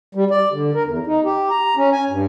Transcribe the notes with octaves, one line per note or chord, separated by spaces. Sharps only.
G3
D5
D3
A#4
E2
D#4
G4
A#5
C#4
G#5
G2